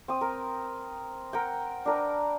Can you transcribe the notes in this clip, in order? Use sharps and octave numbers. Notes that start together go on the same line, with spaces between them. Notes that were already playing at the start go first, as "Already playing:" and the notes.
C4 D#6
A#4
A#4 F#5 G5
D4 A#4 B4